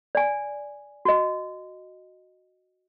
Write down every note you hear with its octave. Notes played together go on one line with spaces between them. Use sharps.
D5 G#5
F#4 D#5